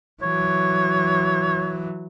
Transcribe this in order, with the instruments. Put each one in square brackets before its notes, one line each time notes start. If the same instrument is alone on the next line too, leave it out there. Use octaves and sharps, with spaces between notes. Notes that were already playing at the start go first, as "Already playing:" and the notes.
[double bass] E3 F#3 [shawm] C#5